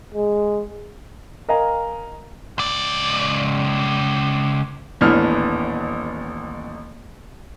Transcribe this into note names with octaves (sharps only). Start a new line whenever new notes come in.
G#3
A#4 D#5 F5 G#5 A#5
C#2 D5
D#1 A1 E3 B3 D4 F6